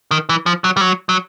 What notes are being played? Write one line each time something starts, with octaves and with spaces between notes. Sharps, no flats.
D#3
E3
F3
F#3
G3
F#3
F#3